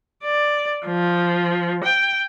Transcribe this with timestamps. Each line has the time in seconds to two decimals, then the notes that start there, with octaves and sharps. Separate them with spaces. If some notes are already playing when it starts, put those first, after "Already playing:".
0.23 D5
0.86 F3
1.84 G5